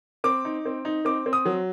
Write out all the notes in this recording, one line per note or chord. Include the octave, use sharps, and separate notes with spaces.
C4 D6
D#4
C4
D#4
C4 D6
C4
D#6
F#3